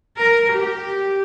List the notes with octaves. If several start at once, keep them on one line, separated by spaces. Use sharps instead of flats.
A#4
G4